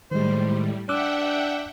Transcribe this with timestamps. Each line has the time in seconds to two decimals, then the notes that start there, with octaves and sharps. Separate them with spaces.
0.11 A2 D#3 G3 G#3 C5
0.89 D4 E5 F#5 G5 D6 E6 F#6